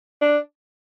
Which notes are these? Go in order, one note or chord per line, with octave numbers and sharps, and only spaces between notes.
D4